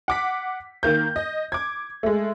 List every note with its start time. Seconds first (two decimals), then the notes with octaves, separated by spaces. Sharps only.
0.08 F#5 D6 B6
0.83 D#3 A#3 G6
1.16 D#5
1.52 D6 G#6
2.03 G#3 A3